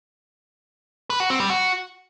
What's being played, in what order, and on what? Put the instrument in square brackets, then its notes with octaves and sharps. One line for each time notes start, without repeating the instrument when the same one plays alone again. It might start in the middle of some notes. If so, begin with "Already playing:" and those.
[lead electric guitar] B4
F#4
C4
G3
F#4